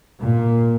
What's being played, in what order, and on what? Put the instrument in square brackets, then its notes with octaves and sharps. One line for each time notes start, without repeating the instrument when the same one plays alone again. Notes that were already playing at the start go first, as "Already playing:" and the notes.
[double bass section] A#2